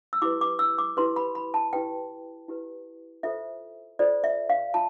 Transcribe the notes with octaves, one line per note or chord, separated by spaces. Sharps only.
E6
E4 G4 B4 D6
D6
E6
D6
E4 G4 B4 C6
B5
B5
A5
E4 G4 B4 G5
E4 G4 B4
F4 A4 C5 E5
F4 A4 C5 D5
E5
F5
F4 A5